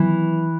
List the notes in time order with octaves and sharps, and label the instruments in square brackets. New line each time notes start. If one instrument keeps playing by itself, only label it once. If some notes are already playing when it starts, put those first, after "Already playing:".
Already playing: [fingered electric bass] D#3 F#3 B3 [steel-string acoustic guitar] E3